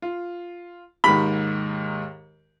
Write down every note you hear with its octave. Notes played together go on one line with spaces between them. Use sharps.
F4
D#2 G#2 D#3 B5